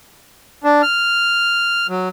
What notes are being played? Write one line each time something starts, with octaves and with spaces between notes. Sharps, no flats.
D4
F6
F#3